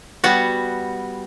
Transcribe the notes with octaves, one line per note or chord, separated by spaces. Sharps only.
G3 B3 F#4